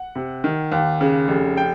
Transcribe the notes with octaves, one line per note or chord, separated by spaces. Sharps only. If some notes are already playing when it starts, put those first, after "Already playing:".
Already playing: F#5
C3
D#3
D#2
C#3
F1
G5